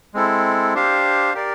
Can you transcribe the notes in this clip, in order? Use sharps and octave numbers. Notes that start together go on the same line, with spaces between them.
G#3 C4 E4 A4
D4 G4 C5 F5
G4 A#4 D5